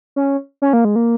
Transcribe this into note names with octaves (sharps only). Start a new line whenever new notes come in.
C#4
C#4
A#3
G#3
A#3